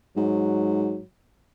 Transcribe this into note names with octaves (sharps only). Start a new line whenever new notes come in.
G#2 F#3